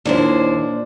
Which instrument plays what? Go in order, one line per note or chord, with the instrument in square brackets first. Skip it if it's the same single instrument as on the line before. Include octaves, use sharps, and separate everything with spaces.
[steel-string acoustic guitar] D#2 E4 C5 [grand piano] A#2 D4